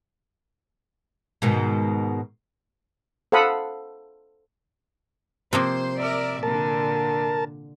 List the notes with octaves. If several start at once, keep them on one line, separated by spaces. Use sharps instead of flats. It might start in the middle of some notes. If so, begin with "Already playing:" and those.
G#2 B2 D#3
A4 C5 F5 F#5 B5 D#6
C3 F3 A#3 C5
A#4 D5 E5
A#2 D3 A#4 A5